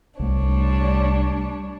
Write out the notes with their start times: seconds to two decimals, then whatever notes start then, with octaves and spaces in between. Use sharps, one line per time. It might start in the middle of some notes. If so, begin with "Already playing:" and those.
0.20 C2 G3 A3 D4 C#5